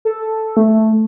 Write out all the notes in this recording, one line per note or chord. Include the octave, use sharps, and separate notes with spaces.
A4
A3